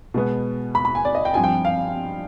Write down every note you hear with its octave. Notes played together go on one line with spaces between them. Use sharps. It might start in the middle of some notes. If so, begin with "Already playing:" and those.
B2 G#3 B3
B5
B5
G#5
D5
D#5
G5
G2 F3 C4 G#5
G5
F5